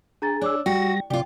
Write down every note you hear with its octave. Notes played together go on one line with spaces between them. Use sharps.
D4 G#4 A#5 A6
D4 C#5 D6 E6
G3 F#4 G5 A#6
C3 F4 G4 D5 G5